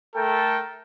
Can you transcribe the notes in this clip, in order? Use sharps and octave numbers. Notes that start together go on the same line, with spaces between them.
A3 A4 A#4 G5